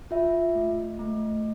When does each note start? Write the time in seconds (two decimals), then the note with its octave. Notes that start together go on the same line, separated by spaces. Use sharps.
0.11 F4 E5
0.55 A3
0.99 A3